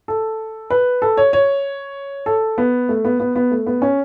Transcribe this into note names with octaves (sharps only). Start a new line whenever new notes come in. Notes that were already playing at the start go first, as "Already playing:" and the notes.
A4
B4
A4
C#5
C#5
A4
B3
A3
B3
B3
B3
A3
B3
C#4